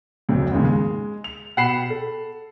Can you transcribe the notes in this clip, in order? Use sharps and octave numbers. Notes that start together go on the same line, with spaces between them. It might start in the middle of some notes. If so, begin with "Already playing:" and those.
D1 F2 C#3 C4
D#2 G#2 C#3 G#3
G#3
F7
B2 F#5 G5 B5 C7 E7
A4